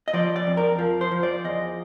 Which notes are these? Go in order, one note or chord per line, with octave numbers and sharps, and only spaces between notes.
D#5
F3 D5
D5
F2
A#4
F3
C5
F3
D5
E2 D#5